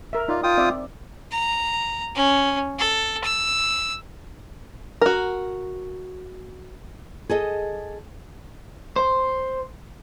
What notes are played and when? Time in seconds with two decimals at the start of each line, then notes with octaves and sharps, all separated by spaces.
0.13 A#4 E5
0.28 D#4 F4 D5
0.43 F4 G5 D#6
0.58 C4 D5 E5
1.32 A#5
2.15 C#4
2.79 A4
3.24 E6
5.01 F#4 A#4
7.29 G#4 A4 D#5
8.96 C5